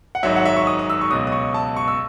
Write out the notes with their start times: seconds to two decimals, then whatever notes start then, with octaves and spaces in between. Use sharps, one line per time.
0.15 F#5
0.23 G#1 G#2 F#3 E5
0.36 F#5
0.45 E5
0.57 C#6
0.67 D#6
0.79 D#6
0.90 E6
1.01 C#6
1.10 C#2 B2 F#3 D#6
1.27 D#6
1.32 C#6
1.54 A5
1.77 C#6
1.88 E6